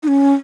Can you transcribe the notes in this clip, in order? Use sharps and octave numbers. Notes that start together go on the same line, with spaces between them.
D#4
C#4